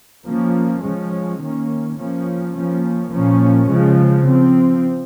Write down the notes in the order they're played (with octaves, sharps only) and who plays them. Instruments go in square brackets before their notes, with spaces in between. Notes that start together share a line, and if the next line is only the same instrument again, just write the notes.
[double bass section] F3 A#3 C#4
F3 G#3 C#4
D#3 A#3 C#4
F3 A#3 C#4
F3 A#3 C#4
A#2 F3 A#3 C#4
C#3 F3 G#3
F3 C4